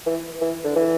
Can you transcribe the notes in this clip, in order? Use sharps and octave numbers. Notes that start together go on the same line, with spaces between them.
E3
E3
D3
E3